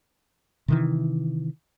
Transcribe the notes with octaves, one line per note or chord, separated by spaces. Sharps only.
C3 D#3 E3